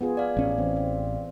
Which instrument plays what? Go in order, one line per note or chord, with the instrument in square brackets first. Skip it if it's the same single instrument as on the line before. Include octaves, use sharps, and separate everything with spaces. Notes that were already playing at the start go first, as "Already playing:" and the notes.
[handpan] B3 F4 G#4
[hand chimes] D5 F5
[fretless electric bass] A1 C#4
[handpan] E3 C4
C4